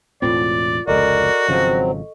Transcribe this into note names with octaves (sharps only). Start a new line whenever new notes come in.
E1 A2 C4 F4 D5
F1 C#2 F#4 A4 A#4 D5 D#5 C#6
G#1 C#3 F3 F#3 C4